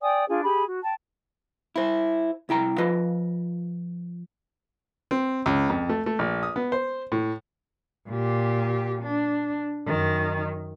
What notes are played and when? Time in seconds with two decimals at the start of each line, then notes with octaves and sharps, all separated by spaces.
0.02 D5 G5 G#5 D#6
0.28 D4 F4 G#4
0.43 G4 G#4 B5
0.66 F#4
0.82 G5 A5
1.76 E4 C5
2.49 C2 E4 G5 A#5
2.78 F3 F4 B4 D#5
5.11 C4
5.46 C#2
5.70 F2
5.89 A3
6.06 A3
6.19 A#1
6.43 D#6
6.56 B3
6.72 C5
7.12 A2
8.08 A#2 G4
9.03 D4
9.87 F#2 D#3